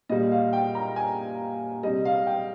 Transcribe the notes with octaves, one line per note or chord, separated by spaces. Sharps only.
A#2 G3 D#5
D#5
F5
G5
A#5
G#5
C3 G3 D#5
F5
G5